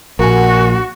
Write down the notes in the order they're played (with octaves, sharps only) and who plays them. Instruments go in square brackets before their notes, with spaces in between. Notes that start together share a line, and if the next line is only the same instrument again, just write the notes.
[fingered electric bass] A#1 [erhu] F#4 [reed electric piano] A#4 F#5 G#5